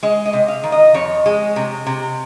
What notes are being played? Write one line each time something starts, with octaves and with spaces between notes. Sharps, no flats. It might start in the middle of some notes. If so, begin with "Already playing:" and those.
G#3 D#5
D#5
C3
F5
D#3
D#5
F2 C#5
G#3
C3
C3